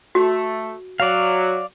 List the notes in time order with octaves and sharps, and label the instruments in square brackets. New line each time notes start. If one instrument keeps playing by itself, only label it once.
[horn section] A3 [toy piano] F#4
[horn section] F#3 [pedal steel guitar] D5 F5